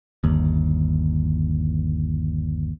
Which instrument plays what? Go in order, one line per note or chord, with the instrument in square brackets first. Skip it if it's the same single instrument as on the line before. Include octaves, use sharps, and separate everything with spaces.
[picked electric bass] G1 D#2